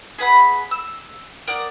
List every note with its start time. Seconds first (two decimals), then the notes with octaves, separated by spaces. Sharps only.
0.18 G#4 B4 F#5 B5
0.71 E6
1.48 A#4 D5 F#5 D#6